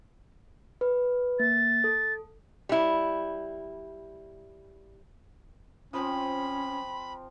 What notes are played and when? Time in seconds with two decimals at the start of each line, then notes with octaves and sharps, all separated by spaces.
0.81 B4
1.40 A#3 A6
1.84 A4
2.69 G3 E4
5.93 F3 C4 C#4 B5